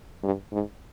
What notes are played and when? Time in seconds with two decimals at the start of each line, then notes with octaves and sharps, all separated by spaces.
0.23 G2
0.53 G#2